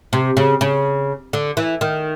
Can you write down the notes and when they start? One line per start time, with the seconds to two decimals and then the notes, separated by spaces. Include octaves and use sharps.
0.13 C3
0.37 C#3
0.61 C#3
1.33 D3
1.57 E3
1.81 D#3